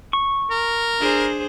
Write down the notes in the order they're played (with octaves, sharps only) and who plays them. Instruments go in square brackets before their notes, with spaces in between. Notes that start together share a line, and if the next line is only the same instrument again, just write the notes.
[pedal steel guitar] C#6
[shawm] A#4
[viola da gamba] D4 G#4 C5